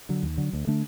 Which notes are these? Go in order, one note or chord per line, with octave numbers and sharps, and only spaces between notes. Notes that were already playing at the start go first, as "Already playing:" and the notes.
D3 F#3
D#2
D3 F#3
D2
D3 A3 D4